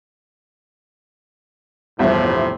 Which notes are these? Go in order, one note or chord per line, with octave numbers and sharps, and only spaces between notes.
G1 E2 A2 C3 F3 E5